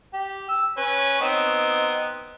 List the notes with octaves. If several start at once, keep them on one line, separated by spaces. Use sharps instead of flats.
G4
E6
C#4 B4 C#5
B3 C4 D#4